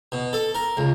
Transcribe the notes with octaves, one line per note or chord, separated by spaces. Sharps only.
B2
A4
A#4
C#2